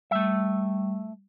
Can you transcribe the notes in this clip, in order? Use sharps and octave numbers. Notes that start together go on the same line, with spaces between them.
G3 A3 E5